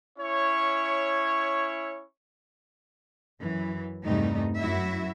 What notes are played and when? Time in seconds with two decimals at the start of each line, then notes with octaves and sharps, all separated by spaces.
0.19 C#4 E4 C#5
3.41 F#2 E3
4.05 E2 G2 C3 G3 A3 D#4
4.58 F#2 E4 F#4 E5